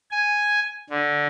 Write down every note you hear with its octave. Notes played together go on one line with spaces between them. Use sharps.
G#5
D3